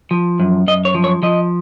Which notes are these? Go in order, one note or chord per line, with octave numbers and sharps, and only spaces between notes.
F3
F#2
F#2 D#5
C#5
F3
C#5
F3 D#5